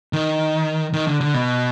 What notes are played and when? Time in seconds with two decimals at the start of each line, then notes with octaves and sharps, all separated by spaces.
0.13 D#3
0.93 D#3
1.07 D3
1.21 D3
1.34 B2